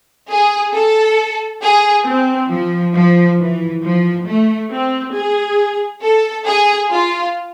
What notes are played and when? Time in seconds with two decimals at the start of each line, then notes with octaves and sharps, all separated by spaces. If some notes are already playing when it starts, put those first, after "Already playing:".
0.29 G#4
0.74 A4
1.61 G#4
2.06 C4
2.51 F3
2.94 F3
3.39 E3
3.83 F3
4.26 A3
4.71 C4
5.14 G#4
6.02 A4
6.47 G#4
6.90 F4